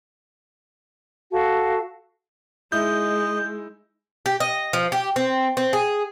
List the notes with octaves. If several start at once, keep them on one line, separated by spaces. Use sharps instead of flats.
F#4 A4 F5 A5
G#3 D#4 E4 D#5 G6
G4
D#5
F3
G4
C4
C4
G#4